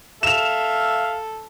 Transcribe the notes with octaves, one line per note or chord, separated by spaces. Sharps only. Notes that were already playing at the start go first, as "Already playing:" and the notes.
A4 E5 F5 E7 F7